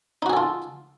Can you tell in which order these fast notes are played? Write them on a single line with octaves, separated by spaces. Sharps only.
D#4 F#4 G#4 A4 F4